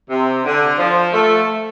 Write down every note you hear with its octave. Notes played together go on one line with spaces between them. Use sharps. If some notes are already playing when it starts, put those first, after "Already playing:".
C3
D3
F3
A3